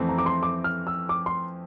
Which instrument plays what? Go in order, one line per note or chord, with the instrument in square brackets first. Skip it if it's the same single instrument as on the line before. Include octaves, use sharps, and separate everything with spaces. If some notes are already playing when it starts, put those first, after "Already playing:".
Already playing: [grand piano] F2 E3 A3 C4
[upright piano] A#5
D6
C6
D6
F6
E6
D6
C6